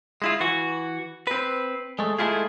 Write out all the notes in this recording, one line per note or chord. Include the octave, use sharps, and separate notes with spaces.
G#3 E4 F4
E3 F#4
C4 B4
G#3 A3
G#3 A3 C#4 E4 F4 G#4